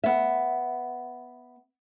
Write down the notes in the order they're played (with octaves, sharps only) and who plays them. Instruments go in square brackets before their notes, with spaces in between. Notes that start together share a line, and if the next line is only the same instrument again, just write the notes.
[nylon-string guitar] B3 E5